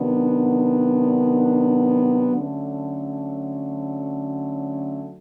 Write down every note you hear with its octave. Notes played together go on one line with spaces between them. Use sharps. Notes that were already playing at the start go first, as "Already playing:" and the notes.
Already playing: C3 D#3 F#3 B3 D4
D3 F#3 A3 C#4